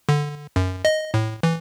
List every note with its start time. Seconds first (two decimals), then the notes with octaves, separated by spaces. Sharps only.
0.09 D3
0.56 F#2
0.85 D#5
1.14 A2
1.43 E3